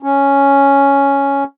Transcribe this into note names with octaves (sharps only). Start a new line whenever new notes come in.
C#4